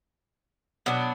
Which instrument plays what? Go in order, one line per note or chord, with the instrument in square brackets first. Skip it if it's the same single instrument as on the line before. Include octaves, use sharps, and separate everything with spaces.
[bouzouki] B2 F#3 B3 D4